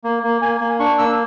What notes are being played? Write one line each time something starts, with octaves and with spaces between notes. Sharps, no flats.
A#3
A#3
A#3 G#5
A#3
D4 C#6
A#3 E6